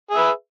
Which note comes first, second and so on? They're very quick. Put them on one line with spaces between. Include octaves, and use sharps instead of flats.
G#4 E5 B4